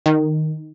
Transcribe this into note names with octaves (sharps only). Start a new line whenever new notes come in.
D#3